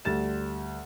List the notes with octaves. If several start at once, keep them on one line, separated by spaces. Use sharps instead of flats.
D2 G3 A6 E7